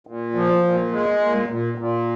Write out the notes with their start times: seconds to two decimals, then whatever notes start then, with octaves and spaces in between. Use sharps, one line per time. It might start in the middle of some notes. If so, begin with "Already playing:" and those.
0.07 A#2
0.35 F3
0.63 A#2
0.92 G#3
1.20 A#2
1.49 A#2
1.78 A#2